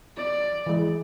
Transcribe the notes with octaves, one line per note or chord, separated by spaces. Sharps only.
D5
E3 G#3